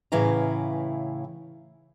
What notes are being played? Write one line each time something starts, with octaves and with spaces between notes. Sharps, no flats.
A2 C#3 E3 E4 F5 A#5